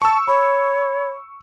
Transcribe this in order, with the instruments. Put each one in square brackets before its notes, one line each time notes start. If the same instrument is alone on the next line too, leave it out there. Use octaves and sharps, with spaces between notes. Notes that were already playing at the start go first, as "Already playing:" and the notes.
[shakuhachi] A5 [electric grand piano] C#6 E6
[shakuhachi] C#5 [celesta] B5